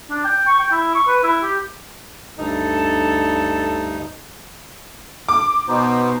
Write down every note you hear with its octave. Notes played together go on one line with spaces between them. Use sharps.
D4
G5
C#6
G5
E4
C#6
B4
E4
G4
D2 G2 D#4 A4
D6
B2 B3 D#4 C5